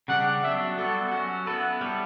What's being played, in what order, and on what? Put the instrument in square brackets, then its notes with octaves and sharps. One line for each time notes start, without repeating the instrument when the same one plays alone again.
[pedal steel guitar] C#3 G3 D4 G4 [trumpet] F#5
[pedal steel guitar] F#3 B3 D4 [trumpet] E5
[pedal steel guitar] G3 B3 F#4 [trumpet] A4
[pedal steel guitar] F#3 C#4 F#4
[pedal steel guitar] B3 E4 B4 [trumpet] A4
[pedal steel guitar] G3 B3 E4 A4